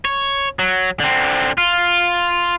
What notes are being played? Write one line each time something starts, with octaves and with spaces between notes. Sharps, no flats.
C#5
F#3
D3 C4
F4